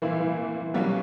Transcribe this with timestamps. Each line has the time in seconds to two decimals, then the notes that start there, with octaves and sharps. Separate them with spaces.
0.02 A#2 E3 A#3 E4
0.20 E3
0.38 E3
0.55 E3
0.74 B2 F#3 G3 A#3 C#4